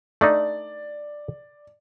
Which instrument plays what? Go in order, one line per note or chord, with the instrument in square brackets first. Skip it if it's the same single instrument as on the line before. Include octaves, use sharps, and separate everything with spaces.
[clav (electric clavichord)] A3 D4 D#4 [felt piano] D5